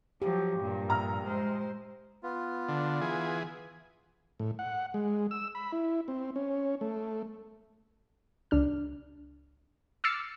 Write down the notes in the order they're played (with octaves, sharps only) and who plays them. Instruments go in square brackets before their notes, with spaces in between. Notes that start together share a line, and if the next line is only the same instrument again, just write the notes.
[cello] F3 F#3 [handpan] G4
[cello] G2 A#2
[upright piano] A#1 A#5 F6
[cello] G#3 C5
[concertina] B3 F4
[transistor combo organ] D3
E3 G#4
A2
F#5
G#3
E6
B5
E4
C4
C#4
A3
[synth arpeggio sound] C#2 D4 F6
D6 E6 F6 A6 C7 C#7